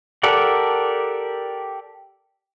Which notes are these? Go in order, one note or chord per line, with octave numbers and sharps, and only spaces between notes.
G4 A4 A#4 D5 F#5